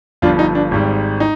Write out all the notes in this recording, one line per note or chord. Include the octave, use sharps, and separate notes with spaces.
G1 G2 F3 D4 F4
D#4
D4
G#1 G#2 G3
D#4